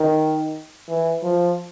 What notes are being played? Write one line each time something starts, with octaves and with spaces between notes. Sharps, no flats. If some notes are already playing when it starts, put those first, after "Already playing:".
Already playing: D#3
E3
F3